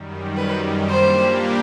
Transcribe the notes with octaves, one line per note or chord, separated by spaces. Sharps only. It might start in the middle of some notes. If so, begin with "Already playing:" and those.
Already playing: F#2 D#3 G3
B4
A#2 G3 A#3 D4 G4 C5